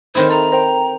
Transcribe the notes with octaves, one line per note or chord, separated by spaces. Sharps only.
D#3 C4 D#4 E4 A4 A#4 C5
A4 A#5
A#4 C5 G5